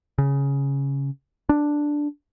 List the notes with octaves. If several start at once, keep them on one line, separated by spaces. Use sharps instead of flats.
C#3
D4